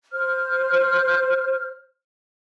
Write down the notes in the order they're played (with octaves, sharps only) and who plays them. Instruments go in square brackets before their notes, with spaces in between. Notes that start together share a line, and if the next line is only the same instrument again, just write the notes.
[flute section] C5 F6